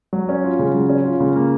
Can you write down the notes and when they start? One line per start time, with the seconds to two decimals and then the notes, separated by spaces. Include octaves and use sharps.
0.13 F#3
0.29 C#4
0.44 F4
0.59 C#3
0.74 F#3
0.89 C#4
1.05 F4
1.20 C#3
1.36 A#3